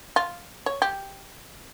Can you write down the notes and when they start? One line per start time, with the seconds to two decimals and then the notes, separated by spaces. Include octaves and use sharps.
0.16 F4
0.66 C#5
0.82 G4